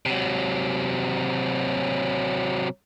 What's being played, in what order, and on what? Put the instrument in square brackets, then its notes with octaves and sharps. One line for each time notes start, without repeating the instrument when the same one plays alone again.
[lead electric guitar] C3 F#3